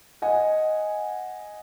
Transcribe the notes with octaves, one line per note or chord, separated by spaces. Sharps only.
D#5 F#5 G#5